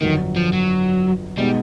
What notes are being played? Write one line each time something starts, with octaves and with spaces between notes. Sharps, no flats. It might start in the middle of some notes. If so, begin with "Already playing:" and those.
G1 F2 D3 D#3 F#3
F3
F#3
B2 G3 G#3 B3 D#4